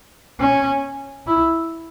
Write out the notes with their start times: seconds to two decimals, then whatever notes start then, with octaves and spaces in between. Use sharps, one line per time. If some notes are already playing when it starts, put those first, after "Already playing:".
0.40 C#4
1.27 E4